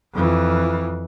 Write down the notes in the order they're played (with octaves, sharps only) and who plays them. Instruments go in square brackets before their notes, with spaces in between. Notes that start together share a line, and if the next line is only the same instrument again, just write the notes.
[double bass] F2 E3